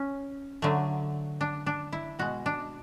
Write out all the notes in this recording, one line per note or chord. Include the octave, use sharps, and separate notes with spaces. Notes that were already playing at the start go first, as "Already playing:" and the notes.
Already playing: C#4
D3 F#3 A3
D4
D4
E4
B2 G#3 F#4
D4